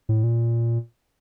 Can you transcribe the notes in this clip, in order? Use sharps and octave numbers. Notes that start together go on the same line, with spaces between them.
A2
A#2